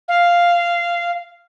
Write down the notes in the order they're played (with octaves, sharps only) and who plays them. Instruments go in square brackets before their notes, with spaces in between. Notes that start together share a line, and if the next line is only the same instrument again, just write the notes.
[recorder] F5